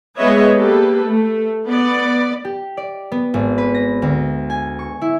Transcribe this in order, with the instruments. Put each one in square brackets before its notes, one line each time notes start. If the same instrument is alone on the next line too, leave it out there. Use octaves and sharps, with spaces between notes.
[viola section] G#3 B3 B4 C#5 D#5 E5
A#3 G4 A4 B4
A3
B3 D5
[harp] G4
D5
B3
G#1
B4
A#6
D2
G#5
C#6
E4